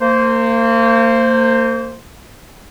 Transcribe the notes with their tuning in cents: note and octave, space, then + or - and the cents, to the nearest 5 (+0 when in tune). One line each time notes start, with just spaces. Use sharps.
A#3 -35 C5 +0